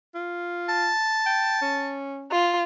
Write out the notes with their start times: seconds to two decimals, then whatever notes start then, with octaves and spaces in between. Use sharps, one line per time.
0.14 F4
0.69 A5
1.26 G5
1.62 C#4
2.31 F4